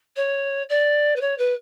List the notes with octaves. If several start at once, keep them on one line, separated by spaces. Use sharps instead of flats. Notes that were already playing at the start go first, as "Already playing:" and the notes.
C#5
D5
B4
C#5
B4